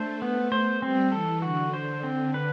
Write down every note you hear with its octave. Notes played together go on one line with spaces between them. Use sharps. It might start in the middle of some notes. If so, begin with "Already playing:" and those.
Already playing: A3 D4 C5
B3
C5
G3 C4
E3 A4
D3 F#4
C5
C4
B4